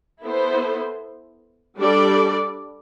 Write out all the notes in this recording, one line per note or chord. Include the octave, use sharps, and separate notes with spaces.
B3 E4 A4 C5
G3 D4 A4 D5